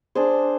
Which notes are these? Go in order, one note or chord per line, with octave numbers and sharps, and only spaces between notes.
D4 G#4 C5